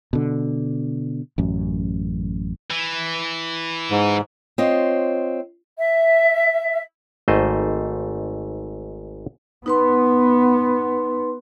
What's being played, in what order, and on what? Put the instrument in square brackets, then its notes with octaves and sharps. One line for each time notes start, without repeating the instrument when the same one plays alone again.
[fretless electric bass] B2 D3
A1 F#2
[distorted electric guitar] E3
[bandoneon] G#2
[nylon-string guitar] C4 F4 C#5 D#5
[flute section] E5
[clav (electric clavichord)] G#1 G#2 A3 C5 D#5
[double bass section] B3 [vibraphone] D#4 B4 C6